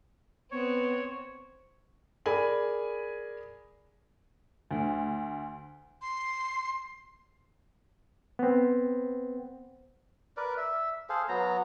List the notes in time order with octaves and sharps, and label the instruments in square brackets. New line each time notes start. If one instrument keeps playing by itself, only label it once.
[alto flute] B3 [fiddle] C4 [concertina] C#5
[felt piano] G#4 A#4 D5 G#5 B5
[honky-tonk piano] D2
[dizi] C6
[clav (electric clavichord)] B3 C4
[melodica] A#4 B4 D5
E5
G#4 A4 C5 F5
F#3 B3 A#5